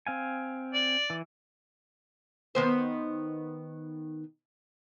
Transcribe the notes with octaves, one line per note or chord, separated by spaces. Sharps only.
C4 F5 G#5
D5
E3
D#3 B3 C5